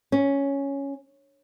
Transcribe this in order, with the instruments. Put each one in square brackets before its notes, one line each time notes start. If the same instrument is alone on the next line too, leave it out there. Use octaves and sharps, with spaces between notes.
[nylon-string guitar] C#4